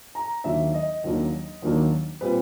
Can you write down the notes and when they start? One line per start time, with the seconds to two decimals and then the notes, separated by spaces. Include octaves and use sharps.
0.15 A#5
0.44 D#2 D#3 F#3 A#3 D4 E5
0.74 D#5
1.04 D#2 D#3 F#3 A#3 D4
1.62 D#2 D#3 F#3 A#3 D4
2.21 A#2 G3 C4 B4